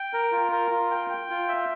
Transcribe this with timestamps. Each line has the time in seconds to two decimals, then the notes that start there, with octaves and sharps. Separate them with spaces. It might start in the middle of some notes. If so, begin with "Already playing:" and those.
Already playing: G5
0.13 A#4
0.32 F4
0.52 A#4
0.71 F4
0.91 G5
1.10 G5
1.30 F4
1.48 E5